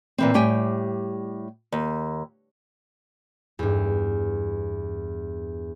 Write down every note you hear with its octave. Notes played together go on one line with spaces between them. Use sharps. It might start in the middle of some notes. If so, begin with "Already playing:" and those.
A#2 E3 C4
A2 G3 G4 G5 G#5
D#2
E2 G2